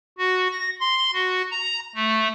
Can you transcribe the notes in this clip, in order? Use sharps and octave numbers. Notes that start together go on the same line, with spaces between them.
F#4
A#6
C6
F#4
A#5
A3